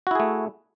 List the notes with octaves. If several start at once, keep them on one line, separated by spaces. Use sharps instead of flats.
A3 E4 F#4 G#4